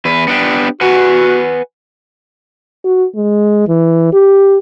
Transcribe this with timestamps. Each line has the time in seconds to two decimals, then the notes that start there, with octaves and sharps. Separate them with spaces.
0.05 E2 B4
0.28 B3 D4 G4
0.81 F#4 B4 F#5 G#5
2.85 F#4
3.16 G#3
3.68 E3
4.13 G4